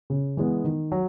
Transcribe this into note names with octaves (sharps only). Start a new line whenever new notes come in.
C#3
E3 G#3 B3
D#3
F#3